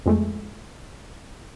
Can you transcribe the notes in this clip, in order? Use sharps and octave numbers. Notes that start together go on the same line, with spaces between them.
F2 G#3 A3